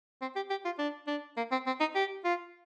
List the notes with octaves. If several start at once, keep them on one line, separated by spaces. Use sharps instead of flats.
C4
G4
G4
F4
D4
D4
A#3
C4
C4
D#4
G4
F4